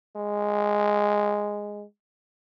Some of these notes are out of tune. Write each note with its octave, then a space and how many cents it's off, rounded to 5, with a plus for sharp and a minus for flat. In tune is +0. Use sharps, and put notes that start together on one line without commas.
G#3 -5